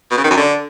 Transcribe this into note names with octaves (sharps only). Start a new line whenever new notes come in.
B2
C#3
D#3
F#2
D3